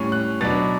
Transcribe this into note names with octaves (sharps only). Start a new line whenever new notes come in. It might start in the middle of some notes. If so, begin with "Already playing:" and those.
Already playing: A2 G3 C#4
F#6
B2 F#3 B3 D4 A6